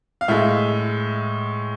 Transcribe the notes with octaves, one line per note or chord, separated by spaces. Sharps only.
F5
A2 G#3 E5